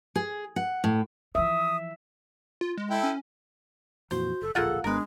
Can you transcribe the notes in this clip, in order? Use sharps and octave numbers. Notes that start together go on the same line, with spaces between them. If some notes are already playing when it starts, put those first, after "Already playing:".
G#4
F#5
A2
E3 F3 E5 D#6
F4
G#3
E4 A4 G5
C#4
F2 A#2 E3 F#4 C5
F#1 A4
D1 A#1 A#3 F4 G#4 A4 F#5
G#1 G#3 B3 D4 A#4 B4